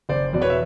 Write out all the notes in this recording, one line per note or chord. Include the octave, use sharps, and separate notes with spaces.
F#1 C5 D5
E2 B2 D5
B4 C#5
E5